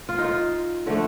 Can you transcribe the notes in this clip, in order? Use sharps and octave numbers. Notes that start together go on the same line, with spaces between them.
F4
D#4
F4
D3 F3 A3 D4